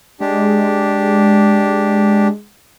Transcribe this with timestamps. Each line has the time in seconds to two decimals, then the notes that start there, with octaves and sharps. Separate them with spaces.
0.20 G#3 D4 G4